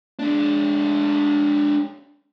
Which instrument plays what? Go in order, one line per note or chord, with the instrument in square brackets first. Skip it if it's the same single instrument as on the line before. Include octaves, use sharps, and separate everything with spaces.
[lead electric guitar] G#3 D4